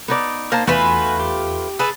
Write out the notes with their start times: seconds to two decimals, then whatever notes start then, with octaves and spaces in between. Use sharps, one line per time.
0.08 B3 D#4 D5
0.52 A#3 A#4 C5 A5
0.67 E2 A3 B3 F4 F#4 B4 G#5
1.19 G4
1.79 G#4 A4 B4